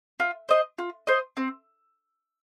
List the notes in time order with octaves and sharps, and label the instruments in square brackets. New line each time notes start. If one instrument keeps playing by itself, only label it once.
[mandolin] F4
C5 D#5
F4
C5 D#5
C4